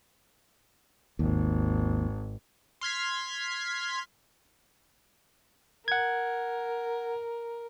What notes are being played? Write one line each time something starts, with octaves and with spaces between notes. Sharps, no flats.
G#1 D#2
C6 F6 G#6 B6
A#4 F#5 G#6